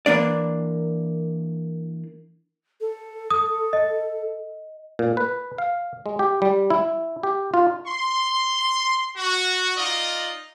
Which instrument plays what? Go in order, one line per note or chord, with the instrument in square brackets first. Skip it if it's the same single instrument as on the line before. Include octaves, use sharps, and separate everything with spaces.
[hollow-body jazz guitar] E3 A#3 D4 D5
[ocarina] A4
[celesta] D#6
D#5
[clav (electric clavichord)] A#2
B4
F5
G#3
G4
G3
E4
G4
F4
[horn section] C6
F#4
D#4 F4 D5 D#5